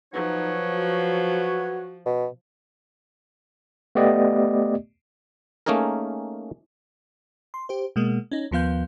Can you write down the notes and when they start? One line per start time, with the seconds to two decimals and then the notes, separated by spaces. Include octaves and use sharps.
0.14 F3 F#3 D#4 B4 C#5
0.72 F#4
2.06 B2
3.95 A3 B3 G4 D5 D#5
5.66 A3 A#3 C#4 D#4 G#4 A#4
7.54 C6
7.69 G4 C5
7.96 B2 G#3 A#3
8.31 C#4 D#4
8.51 D#2 F3 B3 F5 G6